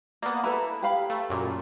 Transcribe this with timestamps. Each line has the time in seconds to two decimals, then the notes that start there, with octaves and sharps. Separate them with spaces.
0.22 A#3 B3 D5
0.44 E4 A4 B4 A#5
0.82 G4 F5 B5
1.10 A3
1.29 F#2 A#2